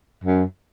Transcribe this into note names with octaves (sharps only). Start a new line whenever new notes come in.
F#2